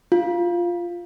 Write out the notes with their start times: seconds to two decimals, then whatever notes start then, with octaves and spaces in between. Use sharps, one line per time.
0.12 F4